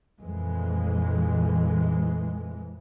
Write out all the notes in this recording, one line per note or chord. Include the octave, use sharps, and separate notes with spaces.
F2 A#2 E3 G#3